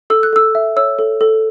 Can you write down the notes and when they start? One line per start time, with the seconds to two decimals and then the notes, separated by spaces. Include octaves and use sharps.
0.10 A4 E6
0.23 F#6
0.33 A4 E6
0.55 E5
0.76 C#5 E6
0.99 A4
1.21 A4